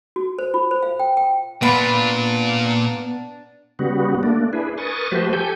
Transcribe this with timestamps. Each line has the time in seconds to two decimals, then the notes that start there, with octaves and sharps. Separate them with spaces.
0.16 F#4
0.39 C5
0.54 F4
0.71 C5
0.83 F5
0.99 G5
1.17 G5
1.62 A#2 B3 D4 F4 B5
3.79 C#3 G3 B3 F#4
4.23 A3 A#3 D4
4.53 D4 E4 G#4 B4
4.78 A#4 B4 G#5 C#6 D#6 A6
5.11 F3 A3 F#4 G4 B4 C5
5.33 G4 A4 G#5 G6